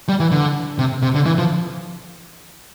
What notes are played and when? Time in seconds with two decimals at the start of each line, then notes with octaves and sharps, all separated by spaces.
0.09 G3
0.20 E3
0.32 D3
0.79 C3
1.02 C3
1.15 D3
1.26 E3
1.38 F3